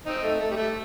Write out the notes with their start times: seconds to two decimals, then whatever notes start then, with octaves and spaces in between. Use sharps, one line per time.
0.06 C4 D#4
0.22 A3
0.40 A3
0.50 G3
0.56 A3